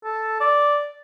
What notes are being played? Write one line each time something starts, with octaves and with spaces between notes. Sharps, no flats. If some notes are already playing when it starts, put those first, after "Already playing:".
A4
D5